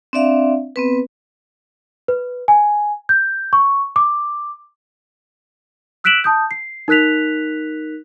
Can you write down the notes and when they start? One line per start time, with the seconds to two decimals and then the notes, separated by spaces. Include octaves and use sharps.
0.13 C4 D4 D5 E5 F5
0.76 B3 C4 B4
2.08 B4
2.48 G#5
3.09 G6
3.53 C#6
3.96 D6
6.04 E6 F#6 B6 D7 E7 F#7
6.24 A5 D#6 G6
6.51 C7
6.88 D#4 A#4 F#6 B6 F7